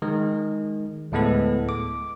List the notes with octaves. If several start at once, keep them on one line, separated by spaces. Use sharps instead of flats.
D#3 G#3
D2 A2 G#3 B3 A4
D6